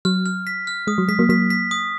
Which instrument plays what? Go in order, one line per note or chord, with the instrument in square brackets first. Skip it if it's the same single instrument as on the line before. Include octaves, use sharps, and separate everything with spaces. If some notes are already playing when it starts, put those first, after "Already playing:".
[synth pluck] F#3 [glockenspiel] F6
[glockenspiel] F6
B6
F6
[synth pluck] G#3 [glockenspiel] D#6
[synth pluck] F#3
[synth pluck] G#3 [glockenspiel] B6
[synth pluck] F#3 A#3
[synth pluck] F#3 A#3 [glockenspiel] B6
[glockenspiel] B6
D#6